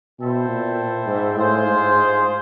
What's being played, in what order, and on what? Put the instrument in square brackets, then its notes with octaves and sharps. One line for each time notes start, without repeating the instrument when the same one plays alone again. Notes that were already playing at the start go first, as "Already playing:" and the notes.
[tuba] B2 [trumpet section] E4 A4 C5 E5 G5
[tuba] A#2
G#2
[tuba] A2 [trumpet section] F4 G#4 C5
[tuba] G#2